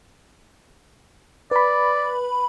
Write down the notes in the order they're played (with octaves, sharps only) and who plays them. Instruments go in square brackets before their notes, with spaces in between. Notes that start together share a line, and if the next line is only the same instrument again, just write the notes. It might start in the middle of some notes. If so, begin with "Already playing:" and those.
[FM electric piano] B4 B5 [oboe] D5